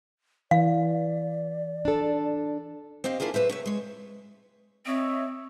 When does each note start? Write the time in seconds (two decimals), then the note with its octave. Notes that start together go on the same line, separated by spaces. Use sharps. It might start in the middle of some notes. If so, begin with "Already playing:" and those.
0.51 E3 D5 F5
1.85 D4 A4
3.04 C4 G4 D#5 F5
3.20 A#3 D4 E4 F4 G#4
3.34 F#2 B4 C5 E5
3.49 C3 C#5 E5
3.66 G#3 C#5
4.86 C4 C#5 D#5 E5